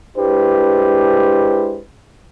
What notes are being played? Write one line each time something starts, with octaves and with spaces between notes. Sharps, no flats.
G#3 D4 E4 G4 B4 C5